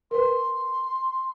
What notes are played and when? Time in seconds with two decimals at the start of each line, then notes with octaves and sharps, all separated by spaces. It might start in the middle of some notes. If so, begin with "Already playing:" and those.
0.11 A#4 B4 C6